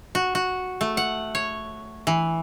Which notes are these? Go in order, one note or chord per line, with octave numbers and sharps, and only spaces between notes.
F#4
F#4
A3
F#5
C#5
E3